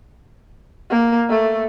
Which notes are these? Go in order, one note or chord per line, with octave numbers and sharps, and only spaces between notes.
A#3
A3